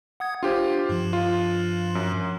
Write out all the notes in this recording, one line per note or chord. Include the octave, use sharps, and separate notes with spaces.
F#5 D#6 G#6
D4 F4 G4 C5
G2 F3
F4
F#2